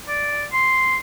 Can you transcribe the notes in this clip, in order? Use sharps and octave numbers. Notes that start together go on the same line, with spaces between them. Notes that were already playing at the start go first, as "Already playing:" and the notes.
D5
C6